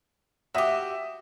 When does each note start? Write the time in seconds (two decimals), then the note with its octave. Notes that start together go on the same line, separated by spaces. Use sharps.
0.54 F#4 G4 E5 D#6